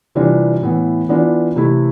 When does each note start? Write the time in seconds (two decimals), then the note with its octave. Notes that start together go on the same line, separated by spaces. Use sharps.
0.15 C3 E3 G3 D4 F4
0.62 A2 E3 B3
1.09 E3 B3 D4 F4
1.56 C3 E3 A3 E4